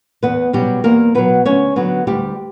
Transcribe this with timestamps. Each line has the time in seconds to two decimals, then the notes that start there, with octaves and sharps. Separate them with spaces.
0.23 E2 B3 B4
0.53 B2 F#3 G3 G4
0.84 E2 A#3 A#4
1.15 B2 F#3 B3 B4
1.46 D2 C#4 C#5
1.76 D3 F#3 B3 B4
2.07 D2 G3 G4